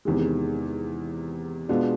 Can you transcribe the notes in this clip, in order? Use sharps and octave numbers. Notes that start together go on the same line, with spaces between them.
E2 C3 D#3 G#3
B2 G#3 B3 D4 F4